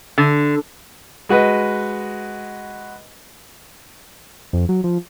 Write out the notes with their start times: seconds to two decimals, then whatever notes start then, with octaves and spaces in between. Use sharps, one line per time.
0.18 D3
1.29 G#3 F#4 B4 D#5
4.53 F2
4.69 F#3
4.84 F3